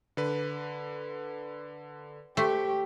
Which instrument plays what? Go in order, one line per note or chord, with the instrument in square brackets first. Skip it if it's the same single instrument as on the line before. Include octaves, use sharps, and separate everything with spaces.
[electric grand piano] D3 B4
[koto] A3 C5 [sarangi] G4 [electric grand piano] C#6 B6